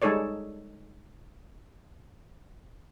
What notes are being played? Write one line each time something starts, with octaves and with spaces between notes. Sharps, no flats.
G3 G#3 D#4 A4 C#5 D5